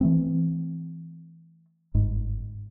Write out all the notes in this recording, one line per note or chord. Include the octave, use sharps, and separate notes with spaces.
E3 A3 C4
G1 G#2